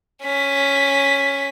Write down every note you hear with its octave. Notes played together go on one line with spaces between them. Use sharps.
C#4 B6